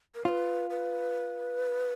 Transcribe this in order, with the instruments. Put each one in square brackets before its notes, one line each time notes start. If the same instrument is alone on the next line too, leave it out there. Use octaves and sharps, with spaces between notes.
[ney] A#4
[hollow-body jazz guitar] F4 [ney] B4 C#5
[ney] B4